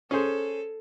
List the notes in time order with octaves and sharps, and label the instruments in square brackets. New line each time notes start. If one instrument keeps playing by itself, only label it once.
[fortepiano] C#4 G#4 C5 [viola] A4